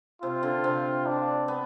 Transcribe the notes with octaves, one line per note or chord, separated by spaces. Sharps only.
C3 F4
D3
C3
D4
B3